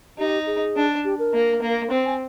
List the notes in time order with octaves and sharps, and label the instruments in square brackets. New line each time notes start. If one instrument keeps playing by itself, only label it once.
[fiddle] D#4 [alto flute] G4
[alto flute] G#4
[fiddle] D4
[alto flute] G4
A#4
[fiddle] A#3
A#3
C4
[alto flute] G#5